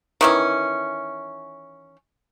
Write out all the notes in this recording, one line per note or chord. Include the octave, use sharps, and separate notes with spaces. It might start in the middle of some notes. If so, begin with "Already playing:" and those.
D#3 E3 C#4